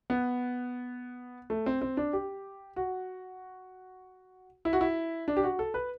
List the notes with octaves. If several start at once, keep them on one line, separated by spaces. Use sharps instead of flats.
B3
A3
C4
C4
D4
G4
F#4
E4
F#4
E4
D4
G4
F#4
A4
B4